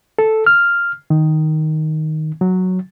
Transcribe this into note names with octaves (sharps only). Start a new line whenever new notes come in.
A4
F6
D#3
F#3